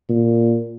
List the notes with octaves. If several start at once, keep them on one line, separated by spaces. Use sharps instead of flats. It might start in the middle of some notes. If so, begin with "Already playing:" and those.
A#2